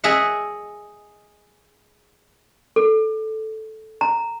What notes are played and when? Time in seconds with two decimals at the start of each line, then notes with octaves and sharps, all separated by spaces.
0.04 G#4 D#5 E5 F#5
2.76 A4
4.01 A#5